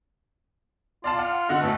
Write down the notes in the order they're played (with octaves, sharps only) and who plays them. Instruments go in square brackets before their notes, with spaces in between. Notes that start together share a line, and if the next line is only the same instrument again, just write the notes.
[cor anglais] F4 [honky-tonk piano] D5 F5 A5
[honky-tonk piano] F#5 F6
[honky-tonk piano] D3 F#4 D#5 [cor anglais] F#5
[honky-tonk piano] D2 A2 B4 [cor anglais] A3